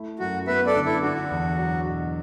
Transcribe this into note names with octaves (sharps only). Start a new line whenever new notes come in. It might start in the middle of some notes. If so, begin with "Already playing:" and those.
Already playing: A3 E4
F#2 F#4
B3 B4 E5
A4 D5
D3
E4 A4
D4 F#4
E2
F#3
B2